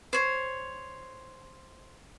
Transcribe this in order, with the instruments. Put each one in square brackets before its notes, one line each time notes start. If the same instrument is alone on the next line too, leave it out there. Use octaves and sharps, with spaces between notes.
[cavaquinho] C5 C#5